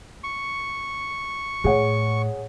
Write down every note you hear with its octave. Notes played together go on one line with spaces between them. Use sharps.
C#6
A2 G#4 C#5 F#5